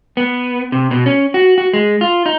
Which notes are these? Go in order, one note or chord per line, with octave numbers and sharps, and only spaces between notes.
B3
C3
B2
C#4
F#4
F#4
G#3
F4
D#4